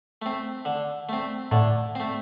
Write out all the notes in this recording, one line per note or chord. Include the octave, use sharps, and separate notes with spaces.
A3 C4
D3
A3 C4
A2 D3
A3 C4